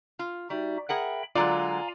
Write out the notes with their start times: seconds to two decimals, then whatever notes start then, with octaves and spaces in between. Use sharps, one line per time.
0.19 F4
0.50 G3 D#4 F#4 E5
0.89 G#4 A#4 E5 F#5 G5 B5
1.35 D3 F#3 G#3 F4 D5 F5 G#5 A#5